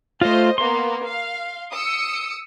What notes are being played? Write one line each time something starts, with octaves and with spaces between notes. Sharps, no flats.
A3 F4 C5 D#5
A#3 B3 C6
F5
D#6 E6 C#7